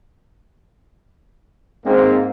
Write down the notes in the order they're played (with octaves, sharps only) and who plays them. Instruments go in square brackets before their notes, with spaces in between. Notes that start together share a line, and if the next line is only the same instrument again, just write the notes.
[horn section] G#2 A#3 [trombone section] C4